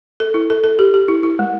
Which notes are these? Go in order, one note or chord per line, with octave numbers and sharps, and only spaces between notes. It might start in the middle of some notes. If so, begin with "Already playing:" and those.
A4
E4
A4
A4
G4
G4
E4
E4
G#3